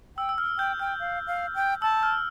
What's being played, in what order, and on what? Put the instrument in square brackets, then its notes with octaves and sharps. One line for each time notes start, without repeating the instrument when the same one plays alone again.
[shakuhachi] G5 [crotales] E6
[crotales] E6
F6
[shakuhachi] G5 [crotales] G6
[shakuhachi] G5 [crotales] F6
[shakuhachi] F5
F5
G5
[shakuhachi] A5 [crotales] E6
[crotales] F6